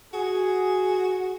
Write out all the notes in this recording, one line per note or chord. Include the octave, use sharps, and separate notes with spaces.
F#4 G#4